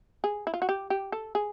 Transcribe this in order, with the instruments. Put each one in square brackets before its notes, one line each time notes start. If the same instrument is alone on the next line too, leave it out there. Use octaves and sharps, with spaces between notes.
[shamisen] G#4
E4
F4
F#4
G4
G4
A4
G#4